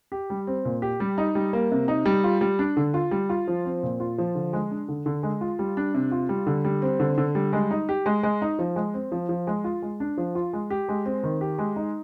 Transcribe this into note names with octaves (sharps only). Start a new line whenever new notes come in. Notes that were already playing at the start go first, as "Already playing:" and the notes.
G4
G3
C4
A#2
G4
G3
D#4
G3
A#3
C3
D#4
G3
F4
G3
D4
D3
F4
G3
F4
F3
C4
A#2
F4
F3
D3
G#3
D4
D3
D3
G#3
F4
G3
D4
C3
F4
G3
D3
G3
C4
D3
D3
G3
G#3
D#4
G4
G#3
G#3
D#4
F3
G#3
C4
F3
F3
G#3
F4
G#3
D4
F3
F4
G#3
G4
G#3
C4
D#3
G4
G#3
D#4